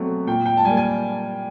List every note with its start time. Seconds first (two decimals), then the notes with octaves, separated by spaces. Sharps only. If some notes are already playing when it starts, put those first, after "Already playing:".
Already playing: B2 F#3 A3 C4
0.27 A#2 G5
0.46 G5
0.57 A5
0.65 G3 G#5
0.69 A#3
0.77 G#5